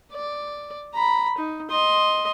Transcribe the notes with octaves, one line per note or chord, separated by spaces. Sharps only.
D5
A#5 B5
D#4
D#5 C6